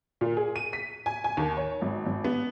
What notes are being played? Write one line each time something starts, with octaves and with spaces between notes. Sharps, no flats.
A#2
G#4
D#7
B6
G#5
G#5
D#2
C#5
G#1
G#1
B3